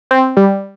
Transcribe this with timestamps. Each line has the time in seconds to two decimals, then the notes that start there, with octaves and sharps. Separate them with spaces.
0.11 C4
0.37 G3